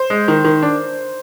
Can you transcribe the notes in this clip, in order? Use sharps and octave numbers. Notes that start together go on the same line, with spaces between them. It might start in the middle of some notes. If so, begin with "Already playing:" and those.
Already playing: C5
G#3
D#3
D#3
D4